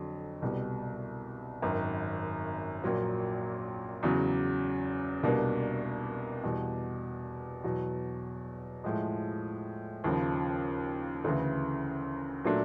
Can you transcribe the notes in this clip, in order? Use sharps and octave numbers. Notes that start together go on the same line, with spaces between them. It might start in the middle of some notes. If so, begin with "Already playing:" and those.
Already playing: F2 D3 F#3
C2 B2 G3
G#1 F#2 D#3
A#1 A#2 F#3 A#3
E2 C#3 F#3
C2 B2 G3 A#3 D4
E2 B2 G3
E2 B2 F#3
A2 F3 G#3
D#2 C#3 F3
D2 C#3 E3
A#2 F#3 A3 D4